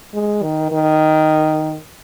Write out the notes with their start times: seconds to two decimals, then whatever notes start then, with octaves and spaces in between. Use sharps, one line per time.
0.14 G#3
0.42 D#3
0.72 D#3